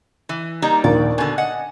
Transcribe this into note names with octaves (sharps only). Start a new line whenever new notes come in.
E3
G3 A#3 D#4
A#1 D#2 A#2 D5
B2 D3 G#5 A6
D#5 F#5